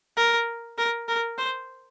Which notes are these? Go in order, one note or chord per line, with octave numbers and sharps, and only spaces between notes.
A#4
A#4
A#4
C5